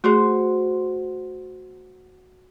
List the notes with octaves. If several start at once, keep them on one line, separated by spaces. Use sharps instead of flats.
A3 F#4 G#4 C5